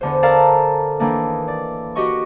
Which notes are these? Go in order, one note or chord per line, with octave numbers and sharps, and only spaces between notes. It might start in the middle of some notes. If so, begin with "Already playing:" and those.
E2 D3 C5
A4 A#4 D5 F5 A5 A#5
D#3 E3 A#3 D4
D5
F#4 G4 D#5 C#6